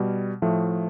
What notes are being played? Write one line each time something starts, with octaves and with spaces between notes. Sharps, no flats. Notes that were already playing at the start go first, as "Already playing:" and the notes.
Already playing: B2 G3
A2 F3 A3